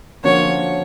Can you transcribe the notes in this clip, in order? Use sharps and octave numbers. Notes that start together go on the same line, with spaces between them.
D3 F3 A#3 C#4 F#4 C#5